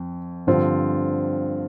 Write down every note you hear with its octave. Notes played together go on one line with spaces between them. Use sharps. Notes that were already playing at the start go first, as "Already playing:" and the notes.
Already playing: F2
G2 D3 F3 C4 F4